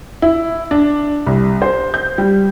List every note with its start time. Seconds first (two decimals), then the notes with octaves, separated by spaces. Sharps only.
0.22 E4
0.71 D4
1.26 C2
1.62 C5
1.94 G6
2.18 G3